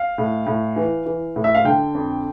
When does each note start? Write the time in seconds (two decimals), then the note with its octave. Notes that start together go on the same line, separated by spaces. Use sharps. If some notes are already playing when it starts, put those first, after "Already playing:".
Already playing: F5
0.18 A2
0.46 A2
0.76 E3
1.06 E3
1.36 A2
1.44 E5
1.55 F5
1.65 D3 G5
1.95 F2